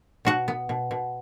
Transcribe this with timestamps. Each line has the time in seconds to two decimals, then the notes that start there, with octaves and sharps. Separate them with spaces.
0.25 B2 F#4 F#5
0.48 B3
0.69 B2
0.91 B2